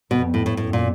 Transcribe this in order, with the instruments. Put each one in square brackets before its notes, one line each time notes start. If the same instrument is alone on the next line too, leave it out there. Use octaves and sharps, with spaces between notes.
[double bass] F2 [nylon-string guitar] B2
[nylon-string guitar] A2
A2
[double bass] F#2 [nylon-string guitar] A2
[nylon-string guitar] A#2